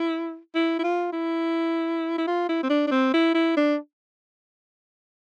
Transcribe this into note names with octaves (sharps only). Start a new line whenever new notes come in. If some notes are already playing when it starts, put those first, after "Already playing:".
Already playing: E4
E4
E4
F4
E4
E4
F4
E4
C4
D4
D4
C4
E4
E4
D4